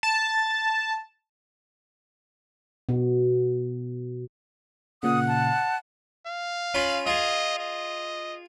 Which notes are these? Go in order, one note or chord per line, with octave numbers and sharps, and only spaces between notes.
A5
B2
A#2 C#3 F#5 D#6
A5
F5
C#4 F4 B5
F4 G#4 D#5
D#5